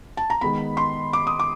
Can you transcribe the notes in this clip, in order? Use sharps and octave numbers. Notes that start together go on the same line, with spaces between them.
A5
A#5
D#3 G#3 B3 B5
C6
D6
D#6
D6